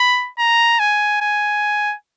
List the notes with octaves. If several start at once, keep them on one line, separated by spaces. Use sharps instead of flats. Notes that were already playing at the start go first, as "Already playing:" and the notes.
Already playing: B5
A#5
G#5
G#5